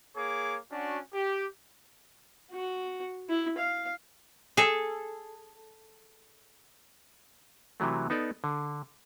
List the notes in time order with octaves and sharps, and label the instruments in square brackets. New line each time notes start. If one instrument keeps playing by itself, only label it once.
[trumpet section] A#3 G#4 C#5 D6
C#4 D4 F#4
G4
[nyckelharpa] F#4
E4
F5
[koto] G#4 A4
[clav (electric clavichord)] C3 E3 F#3 A3
B3 D#4 A4 D5
D3